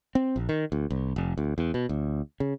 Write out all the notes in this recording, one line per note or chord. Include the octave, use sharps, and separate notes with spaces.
C4
A#1
D#3
D2
C2
F1
D2
E2
B2
D2
C#3